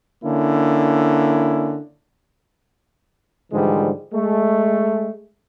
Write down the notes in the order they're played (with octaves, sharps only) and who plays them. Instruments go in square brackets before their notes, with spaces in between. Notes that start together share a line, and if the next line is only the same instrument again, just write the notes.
[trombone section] D3 A#3 C#4 E4
G#2 D3 E3 F3 G3 G#3
G#3 A3